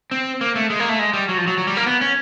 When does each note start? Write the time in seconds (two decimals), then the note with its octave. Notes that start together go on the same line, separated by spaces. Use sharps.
0.11 C4
0.41 A#3
0.56 A3
0.70 G#3
0.80 A#3
0.89 A3
0.99 G#3
1.13 G3
1.29 F#3
1.38 F3
1.47 F#3
1.58 F#3
1.67 G3
1.77 A#3
1.86 B3
2.01 C#4